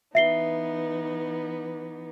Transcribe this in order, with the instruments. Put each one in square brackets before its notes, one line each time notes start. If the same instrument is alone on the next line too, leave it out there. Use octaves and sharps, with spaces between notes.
[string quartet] E3 B3 D#4 [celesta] E5 C7 G7